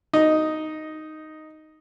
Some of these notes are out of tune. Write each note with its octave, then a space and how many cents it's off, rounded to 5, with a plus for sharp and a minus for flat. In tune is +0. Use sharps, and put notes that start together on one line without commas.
D#4 +0 D#5 +0